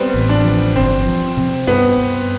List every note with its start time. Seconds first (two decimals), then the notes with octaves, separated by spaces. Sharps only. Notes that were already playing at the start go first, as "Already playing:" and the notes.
Already playing: G3 B3 C4
0.14 A1
0.29 D4
0.45 F3
0.75 G1 C4
1.06 F3
1.37 C3
1.67 G2 B3
1.98 G2